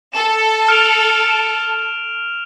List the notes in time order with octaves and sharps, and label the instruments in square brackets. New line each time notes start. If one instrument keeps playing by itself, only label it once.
[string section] A4 [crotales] E7
[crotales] F6 D7 F7
E7